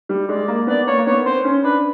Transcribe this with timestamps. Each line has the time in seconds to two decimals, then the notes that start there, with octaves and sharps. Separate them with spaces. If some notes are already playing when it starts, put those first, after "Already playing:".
0.09 G3
0.28 G#3 D5
0.48 A#3
0.67 B3 D5
0.87 A#3 C#5
0.98 A#3
1.07 B3 C#5
1.26 C4 C5
1.45 C#4
1.64 D4 B4